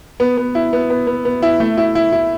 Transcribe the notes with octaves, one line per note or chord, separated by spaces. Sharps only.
B3
B3
E4
B3
B3
B3
B3
E4
A3
E4
E4
E4